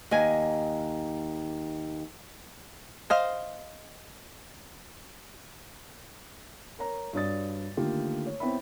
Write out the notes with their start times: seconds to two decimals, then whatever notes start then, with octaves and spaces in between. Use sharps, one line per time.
0.11 D#2 D#5 G#5
3.10 C5 D#5 F5
6.79 A#4 C#5 A#5
7.13 G2 F#4 C#5 D5 D#6 A6
7.77 D3 D#3 A3 A#3 F4 G4
8.26 C#5
8.40 B3 C4 E4 C#5 E5 B5